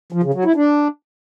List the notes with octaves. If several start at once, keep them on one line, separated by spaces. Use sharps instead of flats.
F3
C#3
F#3
E4
D4